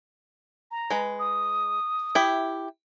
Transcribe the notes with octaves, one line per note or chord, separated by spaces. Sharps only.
A#5
G#3 B4
D#6
E4 G4 E5